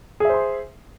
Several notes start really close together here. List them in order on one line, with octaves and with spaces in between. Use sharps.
G#4 E5 C5 C6